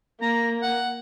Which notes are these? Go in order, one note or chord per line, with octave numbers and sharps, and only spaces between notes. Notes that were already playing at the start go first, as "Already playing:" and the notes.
A#3 A#5
F#5